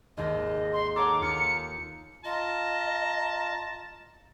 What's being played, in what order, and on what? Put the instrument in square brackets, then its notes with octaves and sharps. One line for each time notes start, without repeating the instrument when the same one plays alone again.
[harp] G#1 D#2 [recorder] D#5
[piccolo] C6
[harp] A4 C#5 F#5 [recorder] A#5 [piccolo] D6
[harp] D#2 D#4 F4 [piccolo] C#7
[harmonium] F4 [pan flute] D#5 [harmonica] A5 A#5